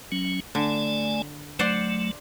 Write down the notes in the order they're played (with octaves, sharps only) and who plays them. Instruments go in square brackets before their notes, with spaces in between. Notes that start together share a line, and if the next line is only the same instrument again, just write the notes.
[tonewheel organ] F#3 C#4
[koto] D3 [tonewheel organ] A3 D5 G#5
[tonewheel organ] F#3 A3 [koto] C5 D5 F#5